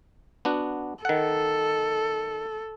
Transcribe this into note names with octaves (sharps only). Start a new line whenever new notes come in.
B3 D4 F#4
D#3 A4 F#5